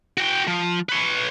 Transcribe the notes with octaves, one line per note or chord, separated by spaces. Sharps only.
F#4 G5
F3
B4 C#5